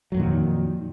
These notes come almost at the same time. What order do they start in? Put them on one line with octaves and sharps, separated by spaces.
F#3 F2 A#2 D#3